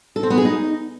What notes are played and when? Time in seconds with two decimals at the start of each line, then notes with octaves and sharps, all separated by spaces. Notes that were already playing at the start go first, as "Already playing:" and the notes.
0.16 A4
0.23 C4
0.30 B3
0.38 G#4
0.45 D#4